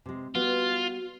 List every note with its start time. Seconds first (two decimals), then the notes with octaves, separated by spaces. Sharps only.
0.06 C3 G#3
0.35 G3 B3 F4 F#4